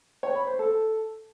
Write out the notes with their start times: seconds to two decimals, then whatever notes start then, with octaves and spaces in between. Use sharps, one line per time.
0.23 C#5
0.35 B5
0.47 C5
0.59 A4